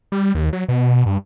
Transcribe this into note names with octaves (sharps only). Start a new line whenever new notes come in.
G3
D#2
F#3
B2
G2